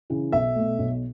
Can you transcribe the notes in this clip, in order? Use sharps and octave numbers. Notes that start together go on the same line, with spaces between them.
C#3 E3
B1 E5
B2 A3
B1